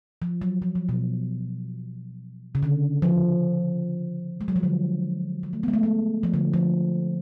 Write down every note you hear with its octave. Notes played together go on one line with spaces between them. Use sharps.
F3
F#3
F3
F3
B2
C#3
D3
F3
G#3
F#3
F3
D3
F#3
A3
G#3 B3
A3
G#3
F3
D3
F3